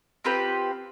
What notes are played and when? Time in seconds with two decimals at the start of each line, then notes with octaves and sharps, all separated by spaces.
0.25 C4 F4 G4 B4